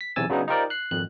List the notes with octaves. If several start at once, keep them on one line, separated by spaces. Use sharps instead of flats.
B6
B1 E2 C3 G#5 E6 A6
C#3 F#3 G#3 B3 D4 D#4
D#4 F4 G4 A#4 C5 D5
F#6 C7
G#1 F2 F#6